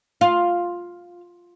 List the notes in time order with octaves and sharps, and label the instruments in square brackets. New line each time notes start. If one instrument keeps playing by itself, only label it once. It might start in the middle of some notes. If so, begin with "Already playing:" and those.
[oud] F4